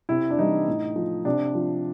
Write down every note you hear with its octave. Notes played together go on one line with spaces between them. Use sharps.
C3 E4
D4
E3 G3 D#4
A2
F3
C3 D4
F3